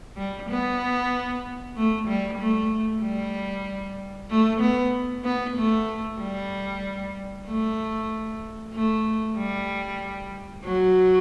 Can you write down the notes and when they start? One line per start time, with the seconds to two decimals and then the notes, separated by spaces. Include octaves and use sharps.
0.17 G3
0.49 B3
1.76 A3
2.08 G3
2.39 A3
3.02 G3
4.30 A3
4.61 B3
5.24 B3
5.56 A3
6.21 G3
7.47 A3
8.73 A3
9.37 G3
10.64 F#3